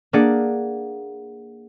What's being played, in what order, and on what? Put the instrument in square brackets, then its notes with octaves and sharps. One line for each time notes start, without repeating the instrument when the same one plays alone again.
[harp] A#3 D4 G#4 D5 F#5